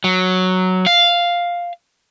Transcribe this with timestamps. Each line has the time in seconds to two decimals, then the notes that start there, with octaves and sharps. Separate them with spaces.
0.04 F#3
0.87 F5